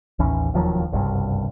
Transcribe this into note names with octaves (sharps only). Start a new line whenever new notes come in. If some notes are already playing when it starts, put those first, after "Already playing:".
A1 D#2 E3 C#4
E1 D#2 F3 F#3
F#1 C2 G2